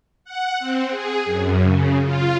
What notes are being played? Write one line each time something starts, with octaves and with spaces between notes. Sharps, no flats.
F#5
C4
G#4
F#2
C#3
F4